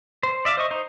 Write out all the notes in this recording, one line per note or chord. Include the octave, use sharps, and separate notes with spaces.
C5
D5 E5 F5 D6
C5 D#5 C#6
D#4 C5